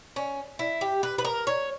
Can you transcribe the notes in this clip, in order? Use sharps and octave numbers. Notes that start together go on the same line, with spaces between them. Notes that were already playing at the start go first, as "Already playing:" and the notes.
C#4
E4
G4
B4
B4
A#4
C#5